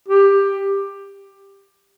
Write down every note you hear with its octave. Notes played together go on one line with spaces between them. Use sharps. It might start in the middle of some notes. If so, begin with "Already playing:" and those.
G4